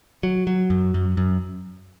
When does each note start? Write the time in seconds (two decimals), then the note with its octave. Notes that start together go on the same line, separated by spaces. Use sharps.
0.23 F#3
0.47 F#3
0.70 F#2
0.94 F#2
1.17 F#2